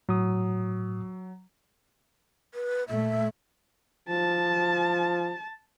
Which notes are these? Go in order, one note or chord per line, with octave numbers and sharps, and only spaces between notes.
A2 F#3 D#6
B4
A#2 A3 E5
F3 A5